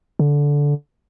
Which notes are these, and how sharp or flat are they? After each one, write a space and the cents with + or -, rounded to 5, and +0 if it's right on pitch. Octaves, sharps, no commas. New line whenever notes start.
D3 -15